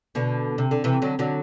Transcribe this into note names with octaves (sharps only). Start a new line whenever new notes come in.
B2 D3
C3
D3
C3 E3
D3 F#3
D3 F#3